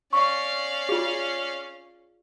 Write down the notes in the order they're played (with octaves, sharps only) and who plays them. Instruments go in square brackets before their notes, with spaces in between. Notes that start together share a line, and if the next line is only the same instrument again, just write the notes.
[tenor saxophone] C#4 [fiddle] D5 F5 [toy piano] C#6
[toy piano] F4 G#4